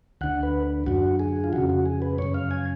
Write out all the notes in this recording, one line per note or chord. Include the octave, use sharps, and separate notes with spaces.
D2 D3 F#5
B4
F#2 D3 F#4
G#4
F4
F2 C#3 F#4
F#4
G#4
B4
F#2 C#3 C#5
F5
G#5